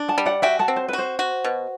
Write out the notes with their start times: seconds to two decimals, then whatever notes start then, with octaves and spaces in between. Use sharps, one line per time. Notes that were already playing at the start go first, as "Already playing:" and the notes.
Already playing: D4
0.08 F#5 A5
0.18 G3
0.26 D5 F#5
0.42 F#4 E5 G5
0.59 F#5 A5
0.68 C4
0.76 C5
0.88 B4
0.93 F#4
0.98 C5
1.19 F#4
1.44 B2